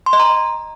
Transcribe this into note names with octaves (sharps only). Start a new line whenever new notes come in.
C6
D#5
A#5